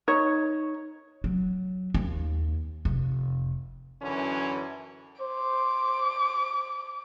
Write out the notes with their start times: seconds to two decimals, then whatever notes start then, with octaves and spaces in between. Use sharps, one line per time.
0.08 D#4 C#5
1.24 F#3
1.94 D#2
2.85 F1
4.02 F#2 D3 E3 C#4 C#5
5.21 C5 D6